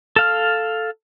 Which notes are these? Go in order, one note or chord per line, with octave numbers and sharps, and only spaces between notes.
A4 F5 F6